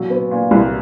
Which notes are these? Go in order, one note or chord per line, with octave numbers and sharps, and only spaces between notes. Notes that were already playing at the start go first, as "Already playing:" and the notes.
Already playing: A#2 F#3
B3
A#2
C2